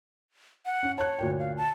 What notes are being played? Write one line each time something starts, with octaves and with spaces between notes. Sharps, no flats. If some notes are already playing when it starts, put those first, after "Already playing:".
F#5
C#4
C#5 A5 F#6
D2 A#2 G5
F5
A5